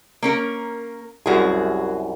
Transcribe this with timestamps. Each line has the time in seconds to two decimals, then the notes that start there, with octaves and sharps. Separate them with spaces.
0.23 A#3 C#4 A#4
1.26 C2 F#2 F#4 G#4